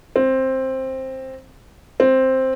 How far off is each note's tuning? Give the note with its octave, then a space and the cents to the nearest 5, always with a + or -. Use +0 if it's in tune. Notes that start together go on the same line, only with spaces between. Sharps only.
C4 +10
C4 +5